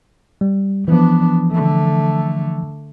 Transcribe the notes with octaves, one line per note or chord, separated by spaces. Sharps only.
G3
E3 F3 B3 D4
D3 A3